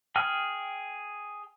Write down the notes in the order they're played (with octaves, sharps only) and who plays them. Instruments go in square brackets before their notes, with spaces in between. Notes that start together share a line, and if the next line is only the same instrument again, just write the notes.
[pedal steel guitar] G#4 G5 F6